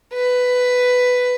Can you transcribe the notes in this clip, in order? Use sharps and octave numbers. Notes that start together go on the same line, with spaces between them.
B4